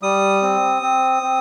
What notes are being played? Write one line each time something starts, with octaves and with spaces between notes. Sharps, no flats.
G3 D#6
C4
C4
C4